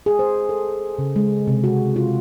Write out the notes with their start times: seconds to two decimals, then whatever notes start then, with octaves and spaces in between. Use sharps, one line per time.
0.06 G#4
0.19 C5
0.49 A4
0.99 C#3
1.16 G#3
1.47 C3
1.64 F#4
1.96 F4